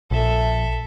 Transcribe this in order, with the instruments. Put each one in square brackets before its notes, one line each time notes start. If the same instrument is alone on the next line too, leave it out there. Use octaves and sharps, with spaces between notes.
[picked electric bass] A#1 [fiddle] A4 E5